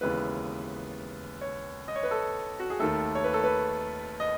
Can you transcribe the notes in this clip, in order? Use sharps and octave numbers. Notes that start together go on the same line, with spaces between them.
D#2 C#3 E3 G#3 B3 B4
C#5
D#5
C#5
B4
A4
F#4
G#4
D#2 D#3 A3 A4
C#5
B4
A4
B4
D#5